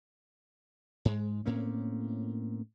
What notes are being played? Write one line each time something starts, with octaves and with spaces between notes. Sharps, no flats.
G#2 G#3
A2 A#3 C4 C#4